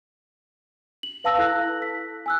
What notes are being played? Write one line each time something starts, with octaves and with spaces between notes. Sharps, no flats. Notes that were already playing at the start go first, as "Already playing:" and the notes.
F#7
B4 F5 A5 E6 A#6
E4 A4 E6 F#6 A#6
B6
G#5 E6 F#6